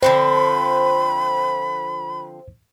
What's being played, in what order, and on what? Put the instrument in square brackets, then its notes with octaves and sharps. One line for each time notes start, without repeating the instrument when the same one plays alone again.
[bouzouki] D3 F3 C4 [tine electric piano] C5 [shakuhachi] B5